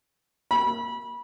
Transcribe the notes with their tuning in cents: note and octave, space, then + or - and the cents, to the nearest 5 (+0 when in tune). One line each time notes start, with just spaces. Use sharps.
B5 -25